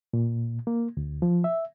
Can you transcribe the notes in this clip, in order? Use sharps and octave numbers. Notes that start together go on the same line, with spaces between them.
A#2
A#3
D2
F3
E5